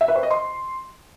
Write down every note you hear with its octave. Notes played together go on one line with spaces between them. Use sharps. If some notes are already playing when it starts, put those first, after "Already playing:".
E5
B4
C5
D#5
C6